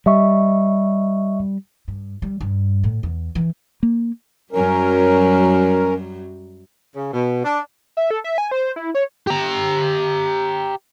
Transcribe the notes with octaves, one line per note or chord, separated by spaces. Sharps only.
G3 D#5 E5 C#6
G2
G3
G2
A2
E2
E3
A#3
F#2 F#3 G3 C#4 A#4
C#3
B2
D4
E5
A4
E5
G#5
C5
E4
C#5
G4 A#5